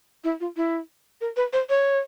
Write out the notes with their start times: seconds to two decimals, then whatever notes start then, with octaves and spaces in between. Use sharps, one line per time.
0.24 E4
0.40 F4
0.57 E4
1.21 A#4
1.37 B4
1.53 C5
1.70 C#5